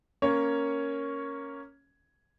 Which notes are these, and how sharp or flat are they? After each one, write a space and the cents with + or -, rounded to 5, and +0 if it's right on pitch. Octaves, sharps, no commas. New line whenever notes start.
A#3 +0 C#4 +0 C#5 +0